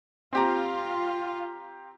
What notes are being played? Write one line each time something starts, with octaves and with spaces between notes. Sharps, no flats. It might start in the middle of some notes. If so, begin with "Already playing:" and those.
C4 F4 G4 A#5